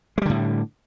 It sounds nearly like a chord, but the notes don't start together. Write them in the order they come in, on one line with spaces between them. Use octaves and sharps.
G#3 G3 D3 A2